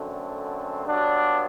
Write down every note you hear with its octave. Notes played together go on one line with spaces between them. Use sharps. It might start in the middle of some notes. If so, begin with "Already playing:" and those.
Already playing: F#2 D3 A3 C4
G2 F#3 B3 D4